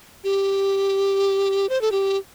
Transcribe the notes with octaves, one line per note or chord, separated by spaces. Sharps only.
G4
C5
A4
G4